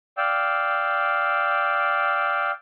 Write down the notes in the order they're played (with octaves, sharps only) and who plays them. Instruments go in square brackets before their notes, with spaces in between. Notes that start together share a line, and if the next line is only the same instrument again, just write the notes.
[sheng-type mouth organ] D5 F5 G5 E6